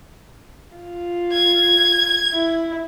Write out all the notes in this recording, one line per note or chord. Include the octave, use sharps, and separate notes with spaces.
F4
G#6
E4